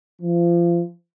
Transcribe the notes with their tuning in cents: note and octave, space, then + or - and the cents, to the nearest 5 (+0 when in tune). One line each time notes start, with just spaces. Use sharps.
F3 -30